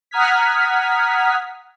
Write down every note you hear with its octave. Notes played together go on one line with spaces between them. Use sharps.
F#5 A#5 D#6 F6 G#6 B6